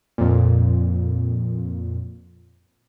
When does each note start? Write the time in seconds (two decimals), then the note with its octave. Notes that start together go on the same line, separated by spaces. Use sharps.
0.18 F2 A#2